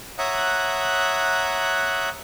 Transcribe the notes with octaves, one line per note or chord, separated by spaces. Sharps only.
C#5 E5 F#5 A#5 D#6 F#6